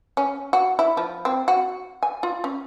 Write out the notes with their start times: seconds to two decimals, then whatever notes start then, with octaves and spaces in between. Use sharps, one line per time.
0.17 C#4
0.53 F#4
0.79 E4
0.97 F3
1.25 C4
1.48 F#4
2.03 G#5
2.23 F4
2.44 C#4